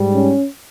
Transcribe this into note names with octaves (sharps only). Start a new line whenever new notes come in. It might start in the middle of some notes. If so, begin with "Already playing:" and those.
Already playing: G#2 G3
C#4